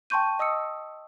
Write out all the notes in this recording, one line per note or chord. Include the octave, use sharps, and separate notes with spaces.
G5 A5 C6 C#6 G6 D#7
D#5 D#6 E6 C#7